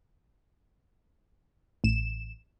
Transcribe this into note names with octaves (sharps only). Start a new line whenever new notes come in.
A1 E7